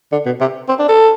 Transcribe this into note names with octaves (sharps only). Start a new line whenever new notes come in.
D3
B2
C3
C4
D4
A4